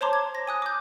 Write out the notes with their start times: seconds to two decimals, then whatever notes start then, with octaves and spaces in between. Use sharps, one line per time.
0.01 C5 C#5 A5 A#5 C6 D6
0.13 G#6
0.35 A#6
0.47 G#5 D#6 F#6
0.62 D6 G6